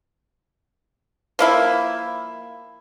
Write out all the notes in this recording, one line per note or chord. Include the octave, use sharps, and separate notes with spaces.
F3 A#3 E4